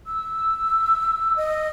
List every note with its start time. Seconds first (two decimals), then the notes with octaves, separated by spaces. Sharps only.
0.07 E6
1.36 D#5